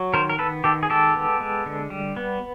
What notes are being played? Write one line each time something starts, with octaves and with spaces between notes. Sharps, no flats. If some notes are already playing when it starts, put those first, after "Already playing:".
Already playing: F#3
D#3 A#4 C5
A#4
B3 A4 B4
D#3 G4 A4
G#4
G#3 G4 A4
B3
G#3
D3
G3
B3